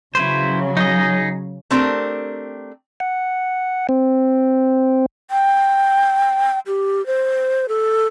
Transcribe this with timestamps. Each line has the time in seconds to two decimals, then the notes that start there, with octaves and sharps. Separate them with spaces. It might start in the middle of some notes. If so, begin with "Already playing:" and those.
0.15 C#3 F#3 E4 B4 C5
0.77 D#4 G#4 D#5
1.71 A3 C4 D4 G4 A#4
3.00 F#5
3.89 C4
5.31 G5
6.67 G4
7.06 C5
7.68 A4